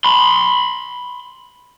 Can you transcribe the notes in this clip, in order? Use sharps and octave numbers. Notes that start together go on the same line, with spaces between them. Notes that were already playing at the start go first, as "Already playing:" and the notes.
B5 C6